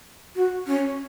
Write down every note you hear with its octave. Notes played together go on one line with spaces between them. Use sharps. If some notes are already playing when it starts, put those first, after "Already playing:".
F#4
C#4